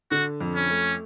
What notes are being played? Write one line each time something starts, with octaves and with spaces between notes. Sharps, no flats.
D3 F#4
F2
C#4
A3